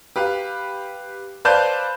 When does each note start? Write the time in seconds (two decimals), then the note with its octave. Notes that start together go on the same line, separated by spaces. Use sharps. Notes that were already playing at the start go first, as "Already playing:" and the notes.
0.16 G4 B4 F5
1.45 B4 C5 D5 F5 A5 G6